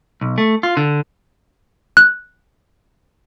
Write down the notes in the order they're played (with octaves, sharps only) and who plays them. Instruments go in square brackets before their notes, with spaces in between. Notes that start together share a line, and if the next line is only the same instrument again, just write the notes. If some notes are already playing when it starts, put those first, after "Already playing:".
[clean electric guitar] B1
A3
F4
D3
[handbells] F#6